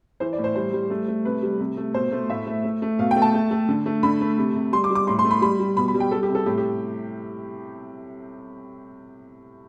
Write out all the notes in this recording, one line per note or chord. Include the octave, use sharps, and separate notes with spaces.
E3 C5
D5
A2
C5
G3 C5
G3
A3
A3
C3 B4
G3
C3
A3
B2 C5
A3
A2 E5
A3
A3
A3
B2 F5
G5
A3
A5
A3
A3
D3
A3
D3 B5
A3
C3
C3
G3 C6
D6
G3
D6
A2 C6
C6
A3
B5
G3 B5
G3
B2 B5
B5
G3
G5
G3 A4
G4
C3
A4
A2 G4
G4